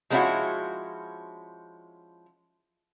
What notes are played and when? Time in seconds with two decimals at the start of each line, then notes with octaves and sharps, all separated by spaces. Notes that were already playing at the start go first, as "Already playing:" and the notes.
0.10 F3 G#3 B3 C#4 E4 F#4